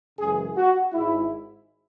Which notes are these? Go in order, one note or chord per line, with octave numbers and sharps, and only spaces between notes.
F#2 C#3 E3 G#3 G#4
F#4
G#1 G#2 G#3 E4